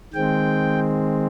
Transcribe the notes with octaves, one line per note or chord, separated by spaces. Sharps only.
D#3 G#3 C4 G5